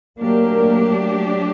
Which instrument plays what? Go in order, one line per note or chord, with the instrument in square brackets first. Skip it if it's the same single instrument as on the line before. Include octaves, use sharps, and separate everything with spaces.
[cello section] F#3 A3 D4 G4 [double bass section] A#3